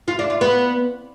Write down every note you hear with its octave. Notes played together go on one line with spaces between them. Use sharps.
F4
D4
F4
B3